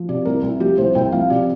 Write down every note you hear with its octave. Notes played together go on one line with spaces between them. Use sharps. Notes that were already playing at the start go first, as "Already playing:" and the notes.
Already playing: F3
C3 D5
C2 A#4
C2
F3 G4
C2 C5
C2 G5
F3 F5
C3 D5